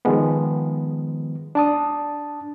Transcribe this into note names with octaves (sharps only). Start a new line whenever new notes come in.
D#3 F3 G#3 B3
D4 A5 D#6